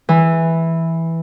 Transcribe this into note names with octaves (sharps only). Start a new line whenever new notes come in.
E3